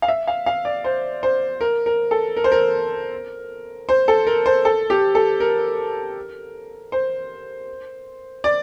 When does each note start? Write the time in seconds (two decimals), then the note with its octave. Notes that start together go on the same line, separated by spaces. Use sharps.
0.02 F5
0.08 E5
0.28 F5
0.46 F5
0.65 D5
0.84 C5
1.23 C5
1.61 A#4
1.86 A#4
2.11 A4
2.37 A#4
2.44 C5
2.52 A#4
3.89 C5
4.08 A4
4.27 A#4
4.46 C5
4.65 A4
4.90 G4
5.15 A4
5.40 A#4
6.92 C5
8.44 D5